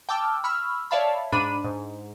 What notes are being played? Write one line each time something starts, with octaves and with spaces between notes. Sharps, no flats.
G5 A5 D6 E6 F6
B5 C#6 E6 F6
C#5 D5 E5 F5 A5 B5
G#2 D4 B5 D#7
G#2